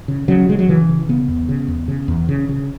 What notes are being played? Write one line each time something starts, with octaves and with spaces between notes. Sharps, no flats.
C#3
C#3 F#3
C#3 G#3
F#3
C#3 E3
C#3
C#3 B3
E2
C#3
E2
C#3
E2
C#3
C#3